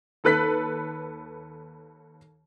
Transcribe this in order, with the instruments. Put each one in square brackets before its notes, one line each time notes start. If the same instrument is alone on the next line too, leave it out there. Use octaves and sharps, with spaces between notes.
[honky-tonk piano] D#2 A4 B4 F#6 B6